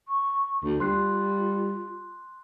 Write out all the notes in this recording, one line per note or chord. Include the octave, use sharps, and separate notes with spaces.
C#6
D2
G3 F4 C6 F#6 C7